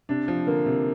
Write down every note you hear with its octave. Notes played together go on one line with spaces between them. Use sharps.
C3 D4
F3
D3 A#3
C3